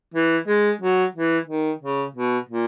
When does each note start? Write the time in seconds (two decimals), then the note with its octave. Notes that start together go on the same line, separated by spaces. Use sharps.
0.14 E3
0.48 G#3
0.81 F#3
1.15 E3
1.48 D#3
1.82 C#3
2.15 B2
2.49 A#2